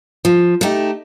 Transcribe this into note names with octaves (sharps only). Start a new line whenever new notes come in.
F3
A3 D#4 G4